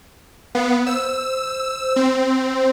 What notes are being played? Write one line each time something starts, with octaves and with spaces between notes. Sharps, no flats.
B3 F5
C5 E6
C4